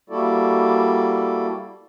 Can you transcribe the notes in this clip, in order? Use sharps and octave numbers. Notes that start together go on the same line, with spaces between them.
G3 A#3 E4 F#4 A4 D5